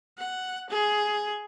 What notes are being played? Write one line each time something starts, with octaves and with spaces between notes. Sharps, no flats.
F#5
G#4